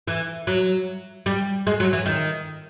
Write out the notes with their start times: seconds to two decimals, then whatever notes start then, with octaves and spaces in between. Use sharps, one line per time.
0.07 E3
0.47 F#3
1.26 G3
1.67 G#3
1.80 F#3
1.93 E3
2.06 D#3